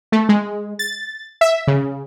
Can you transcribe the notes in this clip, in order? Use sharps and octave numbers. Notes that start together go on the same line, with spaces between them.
A3
G#3
A6
E5
C#3